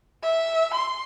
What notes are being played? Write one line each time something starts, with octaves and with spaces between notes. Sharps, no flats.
E5
C6